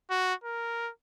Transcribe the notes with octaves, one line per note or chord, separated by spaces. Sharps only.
F#4
A#4